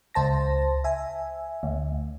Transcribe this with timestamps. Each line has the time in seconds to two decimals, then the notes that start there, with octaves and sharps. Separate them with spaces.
0.14 C#2 C5 A5 A#6
0.84 E5 G#5
1.63 D2